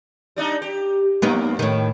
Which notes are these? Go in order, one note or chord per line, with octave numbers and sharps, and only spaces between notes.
G3 D4 D#4
G4
F2 A#3 B3 D#4
A2 D#3